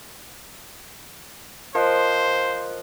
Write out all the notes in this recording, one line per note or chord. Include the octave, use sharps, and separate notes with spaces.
F3 A#4 C5 D#5 F#6